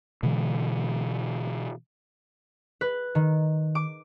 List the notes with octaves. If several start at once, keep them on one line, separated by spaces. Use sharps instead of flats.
B2 D3 E3 G#3
B4
D#3
D6